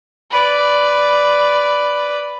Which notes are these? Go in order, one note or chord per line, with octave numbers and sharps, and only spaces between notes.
B4 D5